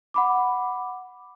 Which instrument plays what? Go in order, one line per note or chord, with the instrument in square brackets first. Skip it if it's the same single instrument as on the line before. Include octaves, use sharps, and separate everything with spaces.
[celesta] F#5 B5 D6